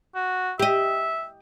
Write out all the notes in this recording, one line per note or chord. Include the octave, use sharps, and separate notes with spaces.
F#4
G4 D#5 E5